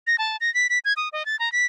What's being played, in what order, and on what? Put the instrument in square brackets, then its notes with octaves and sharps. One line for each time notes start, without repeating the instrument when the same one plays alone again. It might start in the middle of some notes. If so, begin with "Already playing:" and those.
[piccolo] A#6
A5
A#6
B6
B6
G#6
D#6
D#5
A6
A#5
B6